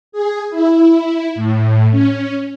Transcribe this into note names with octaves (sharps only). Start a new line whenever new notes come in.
G#4
E4
A2
C#4